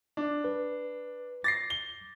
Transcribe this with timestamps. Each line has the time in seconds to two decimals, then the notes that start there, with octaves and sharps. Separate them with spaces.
0.17 D4
0.44 B4
1.44 D6 A6 A#6 C7
1.70 G7